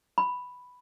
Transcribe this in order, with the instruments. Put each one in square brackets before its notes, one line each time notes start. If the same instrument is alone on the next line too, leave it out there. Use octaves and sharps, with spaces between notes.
[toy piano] B5